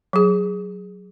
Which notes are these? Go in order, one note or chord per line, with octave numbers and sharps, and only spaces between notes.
F#3 G#4